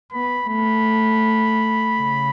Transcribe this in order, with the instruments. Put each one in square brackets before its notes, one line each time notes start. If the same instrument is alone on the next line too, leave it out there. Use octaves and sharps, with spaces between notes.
[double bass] B3 [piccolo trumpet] B5
[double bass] A3 [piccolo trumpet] B5
[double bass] C#3